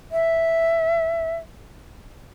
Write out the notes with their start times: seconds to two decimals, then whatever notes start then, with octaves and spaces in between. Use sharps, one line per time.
0.12 E5